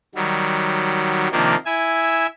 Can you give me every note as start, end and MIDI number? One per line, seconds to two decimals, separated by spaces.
0.15 1.28 51
0.15 1.28 54
0.15 1.28 55
1.32 1.55 48
1.32 1.55 51
1.32 1.55 53
1.32 1.55 58
1.32 1.55 62
1.66 2.27 64
1.66 2.27 76
1.66 2.27 80